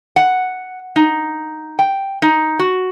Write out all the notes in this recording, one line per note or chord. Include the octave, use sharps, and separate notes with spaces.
F#5
D#4
G5
D#4
F#4